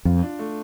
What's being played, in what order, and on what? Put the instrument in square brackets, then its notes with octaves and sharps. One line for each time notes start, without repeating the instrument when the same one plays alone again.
[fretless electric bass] F2 [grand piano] F4
[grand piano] D4
A3